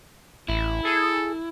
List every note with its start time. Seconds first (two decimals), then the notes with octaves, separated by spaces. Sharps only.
0.48 A1 E4
0.85 G#4 A4